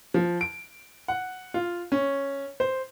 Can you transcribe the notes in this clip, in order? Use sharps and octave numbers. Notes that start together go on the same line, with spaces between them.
F3
D7
F#5
F4
C#4
C5